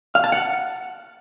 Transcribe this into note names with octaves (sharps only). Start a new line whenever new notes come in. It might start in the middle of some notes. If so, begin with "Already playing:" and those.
F5
A5
F#5